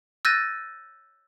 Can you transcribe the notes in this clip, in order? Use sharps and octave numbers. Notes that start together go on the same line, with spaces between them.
E6 F#6 G6 A6 A#6 D#7